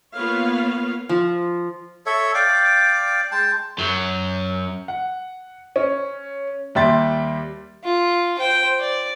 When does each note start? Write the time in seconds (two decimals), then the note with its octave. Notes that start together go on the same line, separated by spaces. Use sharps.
0.14 A#3 B3 F4 B4 C#5 F5
1.09 F3
2.06 A4 C#5 E5
2.34 D5 F5 G5 D6
3.32 G#3 G5 A5
3.78 F#2 F#3
4.88 F#5
5.76 C#4
6.75 D#2 G3 E5 C6 A6
7.84 F4
8.39 C5 G5
8.79 D5